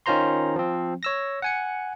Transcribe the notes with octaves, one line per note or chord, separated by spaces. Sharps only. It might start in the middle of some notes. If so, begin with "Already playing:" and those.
D#3 C#4 F4 C5 A#5 C6
F3 C4
C#5 E6 A#6
F#5 G#5 C#7